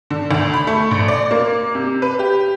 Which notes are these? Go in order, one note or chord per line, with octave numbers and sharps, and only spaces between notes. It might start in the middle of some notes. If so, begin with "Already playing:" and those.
D3
D2
B5
A3
A#1
D5
A#3
C3
B4
G4